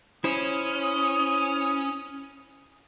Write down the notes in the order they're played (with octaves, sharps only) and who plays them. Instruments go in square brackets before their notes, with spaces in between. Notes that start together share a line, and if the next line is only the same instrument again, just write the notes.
[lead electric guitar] C#4 [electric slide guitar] E4 C5 [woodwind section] D#6